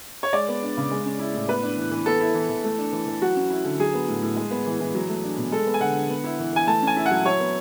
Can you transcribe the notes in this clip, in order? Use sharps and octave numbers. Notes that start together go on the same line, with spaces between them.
C#5
G#3 D5
B3
D4
C#3
G#3
C#4
E4
A2
B3 B4
D4
E3
E3
B3 A4
E4
E3
E3
A3
D4
E3
E3
F#3 F#4
C#4
E4
D3
F#3 G#4
B3
A2
A2
G#3
B3
E3
E3
F#3
A3
D4
B2
G#3 A4
B3
G#5
D3 F#5
D3
B3
E4
E3
E3 G#5
A3 A5
C#4 G#5
E4
F#3 F#5
F#3 C#5
B3